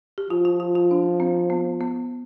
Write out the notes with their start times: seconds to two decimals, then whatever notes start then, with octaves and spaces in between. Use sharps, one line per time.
0.18 G4
0.30 F3 F4
0.45 F4
0.60 F4
0.75 F4
0.91 D4
1.20 C4
1.50 B3
1.81 B3